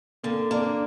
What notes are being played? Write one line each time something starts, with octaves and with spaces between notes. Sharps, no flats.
D3 A#3
A#3 D4